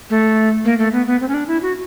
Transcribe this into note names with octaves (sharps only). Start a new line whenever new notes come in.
A3
A#3
A3
B3
B3
C4
C#4
D4
E4
F#4